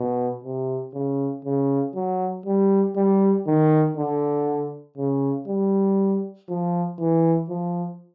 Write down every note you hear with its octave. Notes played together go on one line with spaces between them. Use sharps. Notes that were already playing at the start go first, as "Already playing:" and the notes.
Already playing: B2
C3
C#3
C#3
F#3
G3
G3
D#3
D3
C#3
G3
F3
E3
F3